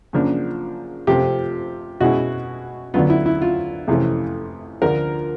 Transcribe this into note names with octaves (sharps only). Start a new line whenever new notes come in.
F#2 C#3 F3 A#3 D4
C3 F3 A3 C4 G4
B2 G#3 C#4 E4 F#4
D2 D3 F#3 B3 F4
E4
E4
F4
F2 C3 E3 A3 C#4
D2 D3 F3 A#4